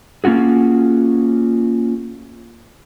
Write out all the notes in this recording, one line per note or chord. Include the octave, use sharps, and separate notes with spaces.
A#3 C#4 F4 F#4 G#4